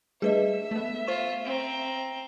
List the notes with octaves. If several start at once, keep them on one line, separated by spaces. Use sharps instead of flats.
G3 A3 D4 G#4 B4 D#5 E5
A3 B3
F4 C5 C#6
C4 A#5